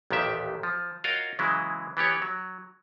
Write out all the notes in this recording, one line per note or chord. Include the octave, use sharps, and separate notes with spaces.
A1 D#2 A#2 D#3 G4 E5
F3
F4 F#4 A#4 C#5 D#5 F5
C#3 E3 F#3 G#3 E4
E3 B3 G4 C#5
F#3